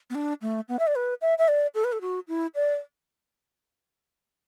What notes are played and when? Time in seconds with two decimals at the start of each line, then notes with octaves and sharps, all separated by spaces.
0.10 B3
0.15 D4
0.42 A3
0.69 B3
0.79 E5
0.87 D5
0.96 B4
1.22 E5
1.38 E5
1.48 D5
1.75 A4
1.84 B4
1.92 A4
2.01 F#4
2.28 E4
2.55 D5